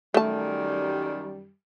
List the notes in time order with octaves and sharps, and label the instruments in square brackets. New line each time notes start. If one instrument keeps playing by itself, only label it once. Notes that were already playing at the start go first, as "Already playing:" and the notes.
[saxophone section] F#2 D#3 G3 [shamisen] A3 A5